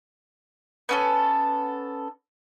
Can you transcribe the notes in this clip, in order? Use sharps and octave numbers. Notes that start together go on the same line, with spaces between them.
B3 C#4 A4